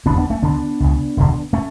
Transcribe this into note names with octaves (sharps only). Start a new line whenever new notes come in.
F#1 E2 D3 B3 D4
B3 D4
A3 C#4
D2 D3 B3 D4
C#2 C#3
E1 D2 D3
A3 C#4